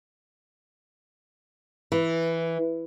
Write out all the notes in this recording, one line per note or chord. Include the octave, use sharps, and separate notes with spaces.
E3